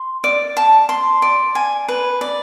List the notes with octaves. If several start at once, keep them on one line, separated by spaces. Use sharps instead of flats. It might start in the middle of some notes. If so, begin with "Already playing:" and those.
Already playing: C6
D5
A5
C6
D5
G#5
B4
D5